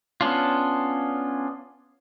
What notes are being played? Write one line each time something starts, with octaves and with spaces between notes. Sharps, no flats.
B3 C#4 D4 F4